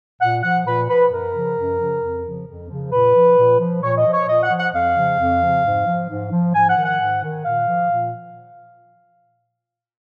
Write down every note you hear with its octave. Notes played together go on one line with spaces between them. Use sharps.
A#2 F#5
F3 F#5
A#2 B4
F3 B4
F#2 A#4
C#3 F3
F#2
C#3 F3
F2
C#3 F3
F2
C#3 F3
A#2 B4
F3
A#2
F3
A#2 C#5
D#5
F3
C#5
A#2 D#5
F#5
F3
F#5
F2 F5
C#3 F3
F2
C#3 F3
G#2
F3
G#2
F3
G#2 G#5
F#5
D#3
F#5
G#2
D#3
A#2 F5
F3
A#2